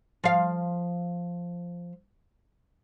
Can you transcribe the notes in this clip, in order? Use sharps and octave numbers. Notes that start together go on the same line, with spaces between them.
F3 F5